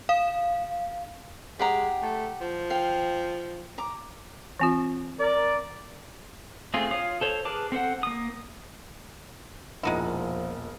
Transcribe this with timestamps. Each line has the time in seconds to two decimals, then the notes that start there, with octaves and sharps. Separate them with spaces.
0.09 F5
1.59 G#3 G4 F#5 A#5
2.02 A3
2.41 F3
2.70 F5 G5
3.78 A#5 D6
4.59 E3 C4 F4
5.19 A#4 D5
6.74 A3 C4 F4 G#4
6.91 F4 C#5 F5 D#6
7.21 A4 C5 C#5
7.45 G#4 A#4 B4 A5 D6
7.72 C4 A4 C5 F#5
8.03 A#3 D#6
9.83 E1 A#2 F3 G#3 D#4 E4 F#5